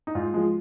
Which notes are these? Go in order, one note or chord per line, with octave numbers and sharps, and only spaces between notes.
D#4
G#2 F4
F3 G#3